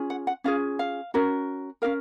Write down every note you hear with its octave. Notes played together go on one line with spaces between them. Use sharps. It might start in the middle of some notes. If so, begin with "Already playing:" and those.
Already playing: C#4 F4 G#4
F#5
F#5
C#4 F4 G#4 F5
F5
C#4 F#4 A#4
C#4 F#4 A#4 F5